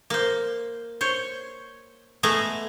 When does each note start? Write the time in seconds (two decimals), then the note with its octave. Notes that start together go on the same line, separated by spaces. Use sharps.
0.10 A#3 C5
1.01 C5 C#5
2.23 G#3 A3 B3 G#4 E5 A#5